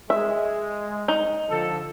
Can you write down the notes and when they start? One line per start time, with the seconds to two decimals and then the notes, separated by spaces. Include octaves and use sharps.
0.10 G#3 E5
1.08 D#4
1.50 D3 F3 A4